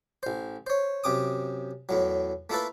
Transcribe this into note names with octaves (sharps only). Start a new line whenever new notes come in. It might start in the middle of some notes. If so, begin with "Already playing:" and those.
A1 C5
C5 C#5
F#2 C3 D6 D#6
E2 A2 F#3
A3 A#3 E4 F4 A4 B4